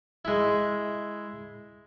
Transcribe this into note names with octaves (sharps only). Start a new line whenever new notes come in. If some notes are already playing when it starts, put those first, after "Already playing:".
G#3 E4